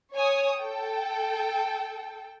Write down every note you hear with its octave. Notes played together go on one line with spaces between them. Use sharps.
C#5 G#5 D#6
A4 G5